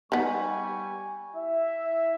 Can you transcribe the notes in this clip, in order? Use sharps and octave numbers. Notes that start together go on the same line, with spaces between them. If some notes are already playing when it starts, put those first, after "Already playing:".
D#3 G3 B3 G#5 C#6
E4 E5